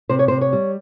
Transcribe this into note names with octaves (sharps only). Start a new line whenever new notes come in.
C3 C5
C#5
C3 C5
C#5
G3